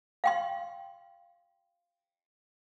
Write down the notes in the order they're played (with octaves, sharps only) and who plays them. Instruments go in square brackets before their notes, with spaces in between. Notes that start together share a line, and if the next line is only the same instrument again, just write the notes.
[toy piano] F5 G5 C6